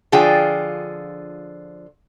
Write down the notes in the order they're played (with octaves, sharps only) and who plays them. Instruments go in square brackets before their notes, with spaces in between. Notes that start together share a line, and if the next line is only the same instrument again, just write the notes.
[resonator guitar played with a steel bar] D3 F3 F4 G#4 G5